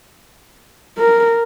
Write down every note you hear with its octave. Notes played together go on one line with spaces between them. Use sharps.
A#4